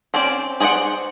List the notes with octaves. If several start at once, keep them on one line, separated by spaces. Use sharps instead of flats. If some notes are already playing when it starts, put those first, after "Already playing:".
C4 C#4 C5 D5
G#4 C5 D5 D#5 F#5